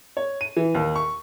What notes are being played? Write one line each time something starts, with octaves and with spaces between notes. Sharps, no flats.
C#5
D#7
E3
D#2
C#6